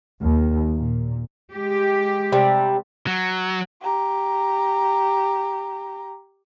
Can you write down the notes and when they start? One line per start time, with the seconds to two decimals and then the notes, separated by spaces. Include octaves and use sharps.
0.22 D#2
0.76 A#2
1.53 G#3 G4
2.32 C3 G3 D4
3.07 F#3
3.82 G4 A#5